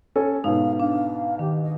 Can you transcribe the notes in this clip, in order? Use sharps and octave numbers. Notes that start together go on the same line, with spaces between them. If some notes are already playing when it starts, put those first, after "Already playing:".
C#4 A4 G#5
G#2 B2 D#4 F5
D4 F5
D#3 G4
D#5